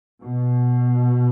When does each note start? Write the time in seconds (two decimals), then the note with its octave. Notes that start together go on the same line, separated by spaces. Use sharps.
0.23 B2